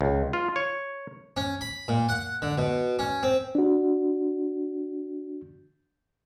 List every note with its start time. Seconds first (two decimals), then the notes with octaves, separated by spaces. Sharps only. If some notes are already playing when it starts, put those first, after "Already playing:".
0.01 C#2
0.33 F4
0.56 C#5
1.37 C#4
1.61 B5
1.88 A#2
2.09 F#5
2.42 D3
2.58 B2
2.99 C#4
3.23 C4
3.55 D4 F#4